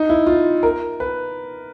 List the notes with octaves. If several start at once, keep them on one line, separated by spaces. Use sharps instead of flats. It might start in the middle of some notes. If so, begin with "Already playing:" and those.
Already playing: D#4
E4
F4
A#4
B4